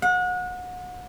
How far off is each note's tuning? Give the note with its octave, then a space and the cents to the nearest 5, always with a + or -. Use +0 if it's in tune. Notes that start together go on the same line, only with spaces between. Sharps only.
F#5 -35